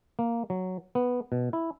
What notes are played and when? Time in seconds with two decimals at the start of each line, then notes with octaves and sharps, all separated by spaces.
0.19 A#3
0.50 F#3
0.95 B3
1.32 B2
1.53 E4